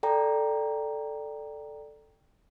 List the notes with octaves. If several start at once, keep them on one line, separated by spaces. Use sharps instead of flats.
A4 D5 G5 A#5